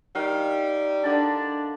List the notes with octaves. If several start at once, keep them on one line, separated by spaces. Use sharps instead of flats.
D#3 G3 F5
D3 D4 D5 A5